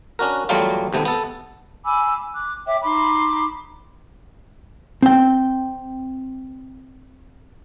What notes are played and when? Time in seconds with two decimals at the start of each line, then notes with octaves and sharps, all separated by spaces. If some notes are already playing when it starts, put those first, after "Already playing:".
0.19 C#4 D4 F#4 A#4
0.49 E2 F#3 G3 A3 A#3 F4
0.93 D#2 C3 A3 B3
1.05 B3 A4
1.85 G#5 B5 D6 E6
2.33 D6 F#6
2.66 C#5 E5 G5 D6
2.83 D#4 B5 C6 D6
5.02 C4 G5